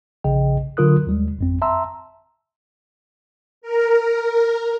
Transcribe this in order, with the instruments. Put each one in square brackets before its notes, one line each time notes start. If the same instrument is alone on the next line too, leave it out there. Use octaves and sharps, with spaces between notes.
[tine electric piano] A#1 C#3 G#4 D#5 G5
D3 F#3 F4 A#4 D#6 F#6
D#2 G3 G#3
G#1 F2 C4
E5 A5 A#5 C6 E6
[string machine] A#4